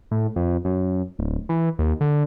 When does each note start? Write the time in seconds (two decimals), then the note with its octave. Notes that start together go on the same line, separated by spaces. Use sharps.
0.11 A2
0.36 F2
0.65 F#2
1.18 D1
1.49 E3
1.79 D#2
2.01 D3